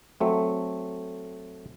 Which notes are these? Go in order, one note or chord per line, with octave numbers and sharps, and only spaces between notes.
F#3 A3 C4